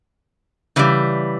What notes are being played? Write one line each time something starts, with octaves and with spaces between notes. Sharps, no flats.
C#3 E3 G3